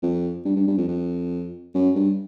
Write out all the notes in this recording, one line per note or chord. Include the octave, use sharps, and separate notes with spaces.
F2
G2
G2
G2
F2
F2
F#2
G2